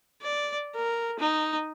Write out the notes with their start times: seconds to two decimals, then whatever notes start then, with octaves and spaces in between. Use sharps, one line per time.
0.22 D5
0.75 A#4
1.19 D#4